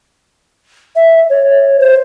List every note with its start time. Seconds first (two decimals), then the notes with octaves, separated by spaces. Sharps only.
0.96 E5
1.30 C#5
1.80 C5